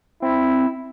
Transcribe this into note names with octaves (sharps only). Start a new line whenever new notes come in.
C4 E4